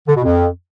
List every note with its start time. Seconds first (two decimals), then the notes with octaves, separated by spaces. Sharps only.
0.08 D3
0.16 B2
0.24 F2